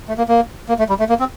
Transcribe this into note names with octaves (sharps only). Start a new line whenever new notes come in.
A3
A#3
A#3
A#3
A3
G3
A3
A#3
C4